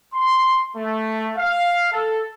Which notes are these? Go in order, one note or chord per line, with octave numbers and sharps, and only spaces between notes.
C6
A3
F5
A4